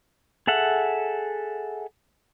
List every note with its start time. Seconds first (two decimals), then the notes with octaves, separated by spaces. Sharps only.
0.47 G#4 A4 E5 F#5